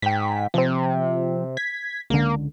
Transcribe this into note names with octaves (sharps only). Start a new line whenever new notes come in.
G#2 G5 B6
C3 F3 C4
G#6 B6
C#2 D3 A#3